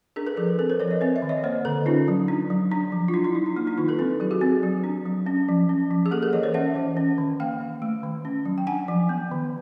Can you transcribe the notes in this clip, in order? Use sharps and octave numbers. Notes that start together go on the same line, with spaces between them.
D4 G#4 A#4
A4 B4
F3 G#4 A#4
A4 B4
C4 A4 B4
A#4 C5
F3 B4 C#5
C#5 D#5
C4 D5 E5
D5 E5
D#3
C#5 D#5
A#3 C5 D5
D3 A4 B4
C#4 D#4 F4
F#3
D4
F#3
D4
F3
F4
D4 E4
D4 E4
F#3 D#4
D4
A#3 D#4
D4 E4
D#3 D#4 F4
A4 B4
C4 A4 B4
F#3 G4 A4
F#4 G#4
C4 F#4 G#4
F#3
D4
F#3
C#4
F3
C#4
F3
G#4
A#3 G4 A4
G#4 A#4
E3 C#5 D#5
C5 D5
C#4 E5 F#5
E3
C#4
D#3
A#3 F5 G5
D#3
A3
D#3
C#4
F#3
G5
D4 F#5 G#5
F3
B3
D#3